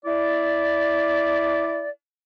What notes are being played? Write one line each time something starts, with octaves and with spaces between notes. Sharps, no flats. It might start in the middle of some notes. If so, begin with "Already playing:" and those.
E4 D5